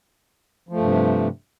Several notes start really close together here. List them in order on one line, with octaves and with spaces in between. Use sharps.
F3 A3 G2 C3